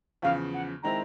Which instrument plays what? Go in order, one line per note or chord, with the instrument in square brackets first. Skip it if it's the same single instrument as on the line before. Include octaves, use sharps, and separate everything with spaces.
[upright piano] E2 C#3 F3 [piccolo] F5
[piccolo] F#5
[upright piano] D#3 G#3 C4 E4 [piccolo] A#5